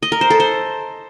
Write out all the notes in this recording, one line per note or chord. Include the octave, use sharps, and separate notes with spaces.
D#5
A#4
C5
A4
C5